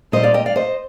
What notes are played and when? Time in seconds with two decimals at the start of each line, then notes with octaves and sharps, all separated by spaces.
0.12 A#2 G3 C5 D#5
0.23 D5 F5
0.34 D#5 G5
0.46 D5 F5
0.56 C5 D#5